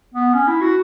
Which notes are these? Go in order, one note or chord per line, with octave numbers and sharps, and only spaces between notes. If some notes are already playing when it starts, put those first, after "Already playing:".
B3
C#4
E4
F#4